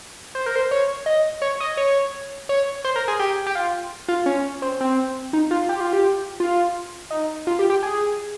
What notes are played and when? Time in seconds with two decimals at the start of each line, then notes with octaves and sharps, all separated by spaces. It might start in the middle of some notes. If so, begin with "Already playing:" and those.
0.35 C5
0.46 A#4
0.56 C5
0.71 C#5
1.06 D#5
1.42 C#5
1.60 D#5
1.77 C#5
2.49 C#5
2.85 C5
2.96 A#4
3.08 G#4
3.19 G4
3.46 G4
3.55 F4
4.08 F4
4.26 C#4
4.62 C4
4.81 C4
5.33 D#4
5.51 F4
5.69 G4
5.80 F4
5.93 G4
6.40 F4
7.11 D#4
7.47 F4
7.59 G4
7.70 G4
7.83 G#4